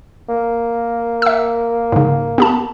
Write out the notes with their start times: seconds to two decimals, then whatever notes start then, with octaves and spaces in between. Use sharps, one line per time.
0.29 A#3
1.22 E5 E6
1.92 G#2 C#3
2.38 B3 G4 A5